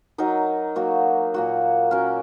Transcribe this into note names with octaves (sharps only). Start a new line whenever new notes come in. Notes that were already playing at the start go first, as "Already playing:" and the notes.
F#3 D#4 A#4
F#3 A#3 F#4 A#4
A#2 A#3 F#4
F#3 C#4 A#4